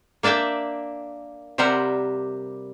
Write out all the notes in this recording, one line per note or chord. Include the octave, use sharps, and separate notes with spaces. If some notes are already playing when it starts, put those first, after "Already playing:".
A#3 D4 D5 E5 G5
C3 G3 A#4 C5 F#5